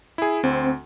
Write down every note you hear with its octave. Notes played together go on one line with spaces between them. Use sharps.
E4 G#4
D2 C4